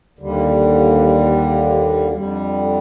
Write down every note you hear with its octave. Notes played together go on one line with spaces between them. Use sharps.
D#2 D3 G3
F2 D3 G3